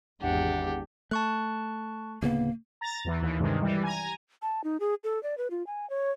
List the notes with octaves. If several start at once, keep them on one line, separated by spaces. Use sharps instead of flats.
G#1 E2 D4 G4 F#5
A3 A5 C#6 F#6
D1 C#3 A#3 B3
A#5 A6
E2 E3
D#2 E3
G2 C3 D#3 G#3
E3 G3
G#5 A#5
A5
D#4
G#4
A4
D5
B4
F4
G#5
C#5